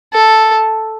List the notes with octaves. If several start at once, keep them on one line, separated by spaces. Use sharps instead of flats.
A4